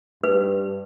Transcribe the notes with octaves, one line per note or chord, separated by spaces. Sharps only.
G2 B4